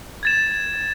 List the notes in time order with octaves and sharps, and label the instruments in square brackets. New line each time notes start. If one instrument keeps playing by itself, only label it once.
[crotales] G#6 A6 E7